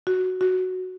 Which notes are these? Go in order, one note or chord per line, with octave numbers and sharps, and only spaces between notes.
F#4
F#4